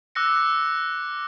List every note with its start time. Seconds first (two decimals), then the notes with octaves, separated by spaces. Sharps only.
0.15 D6 E6 F#6 A#6 C#7